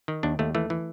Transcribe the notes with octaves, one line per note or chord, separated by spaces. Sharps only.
D#3
D#2 D4
D#2 A3
E3 A3
E3